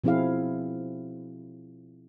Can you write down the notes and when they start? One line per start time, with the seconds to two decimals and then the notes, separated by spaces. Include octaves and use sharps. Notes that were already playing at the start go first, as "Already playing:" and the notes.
0.04 B2 F3 C4 E4 G#4 F5